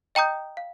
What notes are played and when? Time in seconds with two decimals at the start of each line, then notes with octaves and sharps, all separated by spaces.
0.15 D#5 G5 A#5 D#6 G6
0.57 F5